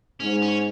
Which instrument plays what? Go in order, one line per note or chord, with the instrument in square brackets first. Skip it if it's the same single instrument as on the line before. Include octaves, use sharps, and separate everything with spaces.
[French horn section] G#2 [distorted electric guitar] C#4
[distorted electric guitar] C#4